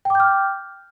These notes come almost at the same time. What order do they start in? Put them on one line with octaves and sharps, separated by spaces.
G5 D6 G6 F6